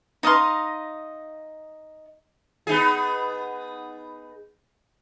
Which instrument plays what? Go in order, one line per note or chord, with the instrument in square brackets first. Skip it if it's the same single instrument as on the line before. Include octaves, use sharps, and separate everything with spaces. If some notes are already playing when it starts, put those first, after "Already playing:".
[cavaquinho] D#4 D#5 F5 C6
[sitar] B3 D#4 G#4